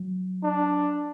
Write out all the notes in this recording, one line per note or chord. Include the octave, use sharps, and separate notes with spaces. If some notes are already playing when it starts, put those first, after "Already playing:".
Already playing: F#3
D4